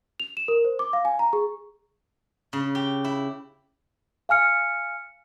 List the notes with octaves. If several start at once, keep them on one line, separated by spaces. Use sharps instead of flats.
F7
E7
A#4
C5
D6
F5
G#5
A#5
G#4
C#3
G4
E4
F5 G#5 F6 C#7